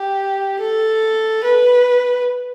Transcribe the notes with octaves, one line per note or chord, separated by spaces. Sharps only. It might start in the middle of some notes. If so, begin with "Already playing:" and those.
Already playing: G4
A4
B4